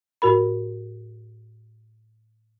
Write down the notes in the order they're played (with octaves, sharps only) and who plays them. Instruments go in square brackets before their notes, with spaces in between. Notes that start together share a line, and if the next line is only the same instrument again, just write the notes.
[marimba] A2 F#4 A#4 B5